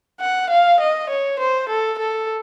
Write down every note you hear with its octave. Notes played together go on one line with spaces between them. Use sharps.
F#5
F5
D#5
C#5
C5
A4
A4